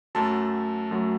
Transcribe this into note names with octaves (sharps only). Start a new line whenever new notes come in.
F#2 F#3 A3 A5
F#2 F#3 A3